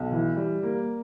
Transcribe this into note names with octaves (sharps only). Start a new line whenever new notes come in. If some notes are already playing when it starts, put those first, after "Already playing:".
Already playing: B1
E3
G3
A#3